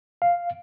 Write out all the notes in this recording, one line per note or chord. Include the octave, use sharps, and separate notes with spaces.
F5